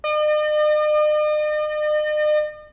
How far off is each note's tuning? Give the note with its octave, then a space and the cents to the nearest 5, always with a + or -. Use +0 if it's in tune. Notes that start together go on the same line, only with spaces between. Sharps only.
D#5 -45